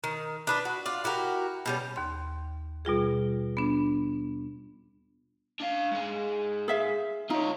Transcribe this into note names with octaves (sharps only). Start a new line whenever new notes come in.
D#3
D4 B4 D#5
F#4
F4 D5
E4 F#4 G4 A#4
B2 G3 C#4
D#2 C6
B2 G3 F4 G#4
B3 D4
D4 F5
G#2 G#3
G#4 E5 F5
D#4 F4 C#5